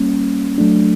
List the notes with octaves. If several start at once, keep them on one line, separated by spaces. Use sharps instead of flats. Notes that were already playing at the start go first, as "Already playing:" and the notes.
Already playing: G3 A#3 C#4
F#3 A3 D4